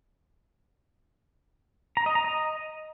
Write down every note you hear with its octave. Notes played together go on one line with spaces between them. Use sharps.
A#5
D#5
A#5
D#5